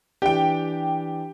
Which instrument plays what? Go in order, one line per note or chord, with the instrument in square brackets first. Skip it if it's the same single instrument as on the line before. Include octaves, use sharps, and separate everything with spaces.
[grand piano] E3 D4 [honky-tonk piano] G4 G5